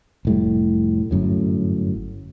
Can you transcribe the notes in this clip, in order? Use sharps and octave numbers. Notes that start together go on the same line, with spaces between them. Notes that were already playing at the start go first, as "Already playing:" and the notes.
F1 A2 G3
G1 F#2 A2